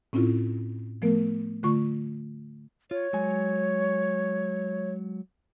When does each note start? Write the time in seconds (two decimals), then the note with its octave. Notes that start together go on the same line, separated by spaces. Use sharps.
0.13 A2 C4 C#4 E4 F4
1.02 F3 A3 B3 A#4
1.63 D3 A3 F4 C#6
2.91 F4 C#5
3.13 F#3 G#3 G#5